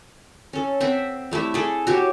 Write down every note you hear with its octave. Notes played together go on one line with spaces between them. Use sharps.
C#4 A4
C4 E5 F#5
G3 A3 E4 E5
G#4 A4
F#4 G4 C#5